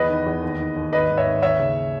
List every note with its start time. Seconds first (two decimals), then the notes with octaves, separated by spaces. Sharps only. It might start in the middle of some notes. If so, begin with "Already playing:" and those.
Already playing: E2 B4 D#5
0.09 D#3
0.26 E2
0.42 D#2
0.59 D#3
0.76 D#2
0.93 G#1 B4 D#5
1.09 G#2
1.17 C#5 E5
1.26 G#1
1.42 D#2 C#5 E5
1.59 C#3